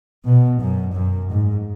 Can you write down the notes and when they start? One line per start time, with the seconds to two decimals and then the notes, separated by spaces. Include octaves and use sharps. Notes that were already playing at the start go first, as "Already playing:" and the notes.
0.25 B2
0.59 F#2
0.94 F#2
1.29 G#2